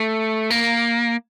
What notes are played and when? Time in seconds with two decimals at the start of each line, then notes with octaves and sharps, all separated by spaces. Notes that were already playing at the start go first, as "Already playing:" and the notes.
Already playing: A3
0.50 A#3